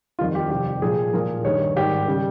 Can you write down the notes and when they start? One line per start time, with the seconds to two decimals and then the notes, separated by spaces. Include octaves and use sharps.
0.19 F2 D#3 G3 F4
0.35 G4
0.50 F2 C3 G3 G4
0.82 A#2 F3 G#4
1.13 A#2 F3 A#4
1.45 G2 D#3 G3 C#5
1.76 G#2 D#3 G3 G4
2.08 C#3 G3